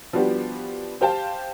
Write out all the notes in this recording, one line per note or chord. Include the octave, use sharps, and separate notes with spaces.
F3 G3 B3 D4 F#4 G4
G4 C5 F5 G5 A5